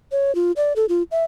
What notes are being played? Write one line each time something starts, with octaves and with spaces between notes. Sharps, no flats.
C#5
F4
D5
A4
F4
E5